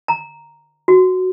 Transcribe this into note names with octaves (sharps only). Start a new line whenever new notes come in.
A#5
F#4